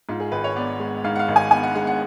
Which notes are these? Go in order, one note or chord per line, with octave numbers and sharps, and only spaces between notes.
G#2 F4
G#4
G#1 B4
C#5
B3 D5
G#3
G#2 F5
F#5
F5
G#1
G#5
B3 G#5
F#5
G#3 F#5
F#5